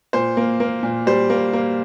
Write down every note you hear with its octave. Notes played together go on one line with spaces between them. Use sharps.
A#2 C5
A#3
A#3
A#2
G3 C5
A#3
A#3